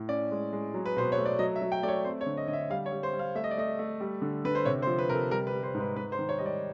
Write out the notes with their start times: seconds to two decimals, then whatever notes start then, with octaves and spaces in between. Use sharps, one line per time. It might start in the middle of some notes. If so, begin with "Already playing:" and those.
Already playing: A2
0.09 C#4 D5
0.31 G#3
0.53 G#3
0.74 F#3
0.86 B4
0.97 B2 C5
1.12 C#5
1.18 A3
1.26 D5
1.39 F#3 D#5
1.56 E5
1.62 F#3
1.72 G5
1.83 A3 D5
1.88 C#5
2.04 C4 C5
2.21 C#5
2.26 D3
2.37 D#5
2.48 D3 D#5
2.53 E5
2.70 G3 F5
2.86 C#5
2.92 G3
3.03 C5
3.13 G3
3.19 F5
3.35 A3 E5
3.44 D#5
3.51 D5
3.57 A3 D#5
3.79 A3
4.00 G3
4.22 D3
4.45 D3 B4
4.55 C5
4.65 C3 C#5
4.82 C5
4.87 F3
4.99 B4
5.09 C3 A#4
5.15 A4
5.31 G3 A#4
5.47 B4
5.53 G3
5.63 C5
5.74 G#2
5.80 B4
5.96 G#2 B4
6.12 C5
6.19 D#3
6.29 C#5
6.39 G3 D#5
6.46 D5